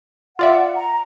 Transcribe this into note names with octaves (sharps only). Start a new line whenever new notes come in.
F4 D5 E5 F#5
A#5